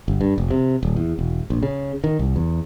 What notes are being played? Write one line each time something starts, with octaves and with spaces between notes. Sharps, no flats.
G1
G2
F1
C3
D#1
E2
E1
A#1
C#3
D#3
C2
E2